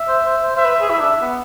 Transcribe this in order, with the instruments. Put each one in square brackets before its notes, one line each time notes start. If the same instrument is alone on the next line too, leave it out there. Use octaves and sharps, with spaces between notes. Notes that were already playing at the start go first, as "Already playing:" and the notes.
Already playing: [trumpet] E5
[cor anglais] C5
C5
C5
[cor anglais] C5 [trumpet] E5
[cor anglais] B4
G#4
[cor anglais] E4 [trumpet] E5
[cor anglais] D4
B3